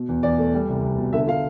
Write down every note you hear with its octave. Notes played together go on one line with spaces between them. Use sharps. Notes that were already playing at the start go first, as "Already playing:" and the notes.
Already playing: B2
E2
E2 D5
A3
G3
C2
C2
B2
D3 E5
D3 F5